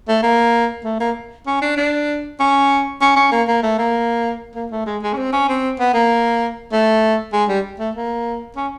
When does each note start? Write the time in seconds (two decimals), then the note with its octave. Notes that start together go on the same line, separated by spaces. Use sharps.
0.08 A3
0.23 A#3
0.84 A3
1.00 A#3
1.46 C#4
1.62 D4
1.77 D4
2.40 C#4
3.01 C#4
3.16 C#4
3.32 A#3
3.48 A#3
3.63 A3
3.79 A#3
4.55 A#3
4.71 A3
4.86 G#3
5.02 G#3
5.14 C#4
5.17 C4
5.33 C#4
5.48 C4
5.80 B3
5.94 A#3
6.72 A3
7.33 G#3
7.49 G3
7.79 A3
7.95 A#3
8.56 C#4